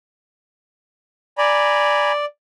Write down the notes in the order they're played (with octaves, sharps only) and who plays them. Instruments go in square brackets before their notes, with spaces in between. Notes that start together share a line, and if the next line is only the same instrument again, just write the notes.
[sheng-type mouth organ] D5 [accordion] G#5 A#5 B5